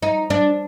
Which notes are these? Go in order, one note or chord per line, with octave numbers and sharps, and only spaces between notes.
D#4
D4